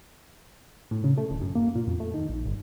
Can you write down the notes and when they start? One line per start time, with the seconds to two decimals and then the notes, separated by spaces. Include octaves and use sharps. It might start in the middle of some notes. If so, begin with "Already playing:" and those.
0.91 A2
1.04 C#3
1.17 A3
1.30 D1
1.41 F#2
1.55 A#3
1.75 A#2
1.87 F2
2.00 A3
2.14 D#3
2.29 A#1
2.46 G1